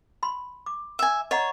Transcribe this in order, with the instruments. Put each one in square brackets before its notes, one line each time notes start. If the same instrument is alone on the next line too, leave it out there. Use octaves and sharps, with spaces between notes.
[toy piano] B5 C6
D6
[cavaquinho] E5 G#5
[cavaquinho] C#5 [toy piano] D#5 F#5 A#5